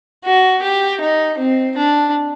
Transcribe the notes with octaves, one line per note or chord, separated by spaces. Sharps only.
F#4
G4
D#4
C4
D4